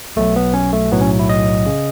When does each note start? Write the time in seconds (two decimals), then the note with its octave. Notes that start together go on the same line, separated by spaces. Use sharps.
0.16 B1 B2 F#3 A3
0.36 B3
0.54 C#4
0.73 A3
0.91 B1 A2 F#3 B3
1.01 C#4
1.19 E4
1.29 D#5
1.66 C#3